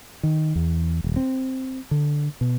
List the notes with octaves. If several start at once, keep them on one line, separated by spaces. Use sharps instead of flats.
D#3
E2
D#1
C4
D3
B2